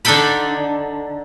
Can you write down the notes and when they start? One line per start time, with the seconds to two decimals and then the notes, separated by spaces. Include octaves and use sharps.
0.05 D3 D4 D#4 A4 G5 B5